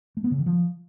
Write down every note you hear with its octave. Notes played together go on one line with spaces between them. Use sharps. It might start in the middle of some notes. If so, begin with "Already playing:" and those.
A3
B3
C#3
D#3
F3